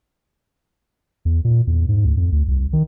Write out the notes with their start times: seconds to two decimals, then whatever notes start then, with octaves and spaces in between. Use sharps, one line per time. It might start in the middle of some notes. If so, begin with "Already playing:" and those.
1.25 E2
1.45 A#2
1.67 E2
1.89 G#2
2.05 D2
2.17 F2
2.32 D2
2.48 C2
2.73 D#3